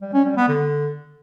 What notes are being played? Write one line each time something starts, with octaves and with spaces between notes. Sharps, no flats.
G3
C#4
G3
B3
D3